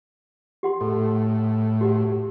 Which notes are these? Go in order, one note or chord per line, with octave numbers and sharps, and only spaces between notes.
G4 F#5 C6
A2 A4
F#4 G4 F#5